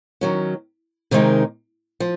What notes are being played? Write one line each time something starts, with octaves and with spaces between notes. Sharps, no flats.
D#3 F#3 C#4
C3 D#3 G#3 D#4 A#4
F3